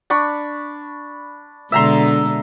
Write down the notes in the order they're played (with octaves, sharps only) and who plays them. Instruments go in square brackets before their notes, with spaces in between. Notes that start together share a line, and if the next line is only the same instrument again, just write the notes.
[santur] D4 B5 C#6
[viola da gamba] B2 D3 G#3 [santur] E5 A#5 C6